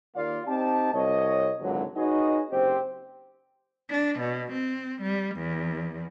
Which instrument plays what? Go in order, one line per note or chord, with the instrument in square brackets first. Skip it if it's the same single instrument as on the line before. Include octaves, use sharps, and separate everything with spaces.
[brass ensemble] D#2 A#3 F4 D5 F5
C4 D#4 G4 A5
C2 C#5 D#5
G#1 C#2 G#2 D3 F#3
D#4 F#4 G#4 B4 C#5 D#5
F#1 C4 G4 C5
[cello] D4
B2
C4
G3
E2